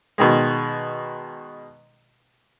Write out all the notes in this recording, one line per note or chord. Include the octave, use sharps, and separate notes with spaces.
B2 D#3 G#3